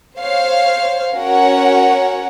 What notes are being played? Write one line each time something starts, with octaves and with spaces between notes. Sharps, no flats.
C5 C#5 F5
C#4 F#4 A#4 C#5 F#5